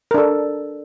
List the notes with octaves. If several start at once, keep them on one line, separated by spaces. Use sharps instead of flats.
D4 A4 A#4